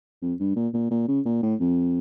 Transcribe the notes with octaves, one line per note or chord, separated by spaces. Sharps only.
F2
G2
A#2
A#2
A#2
C#3
A#2
A2
F2